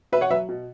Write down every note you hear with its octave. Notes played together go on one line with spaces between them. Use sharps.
B2 B4 E5
C#5 F#5
F#3 B4 E5
B2